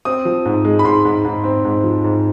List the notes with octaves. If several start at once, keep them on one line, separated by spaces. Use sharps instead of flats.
C4 D#6
F3
G#2
G#3
B5
G#2 C6
G#2
G#2
C4
G#2
F3
G#2